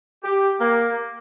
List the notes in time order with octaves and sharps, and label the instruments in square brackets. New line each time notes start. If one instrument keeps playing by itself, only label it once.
[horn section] G4
A#3